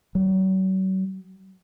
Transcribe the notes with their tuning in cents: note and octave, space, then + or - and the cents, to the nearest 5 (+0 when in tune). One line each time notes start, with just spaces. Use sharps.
F#3 +40